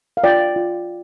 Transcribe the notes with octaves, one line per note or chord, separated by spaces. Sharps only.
F5
F4 D5 G5
F4